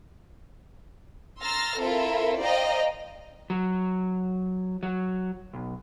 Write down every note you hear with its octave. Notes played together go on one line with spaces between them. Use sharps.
A#5 C6 E6 F6 A6 A#6
C4 E4 F4 A4 A#4 E5
C5 D5 D#5 F5 G5 A#5
F#3
F#3
B1